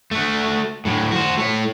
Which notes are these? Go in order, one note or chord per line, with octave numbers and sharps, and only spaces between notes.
A3 F#4
A2 F#3
F#4 C5
A3 C#5